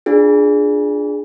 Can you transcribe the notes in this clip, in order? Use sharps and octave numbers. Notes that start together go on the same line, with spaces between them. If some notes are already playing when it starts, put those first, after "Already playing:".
D4 F4 G#4